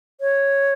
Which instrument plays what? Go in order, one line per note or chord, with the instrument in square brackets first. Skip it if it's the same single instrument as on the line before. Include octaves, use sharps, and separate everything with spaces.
[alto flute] C#5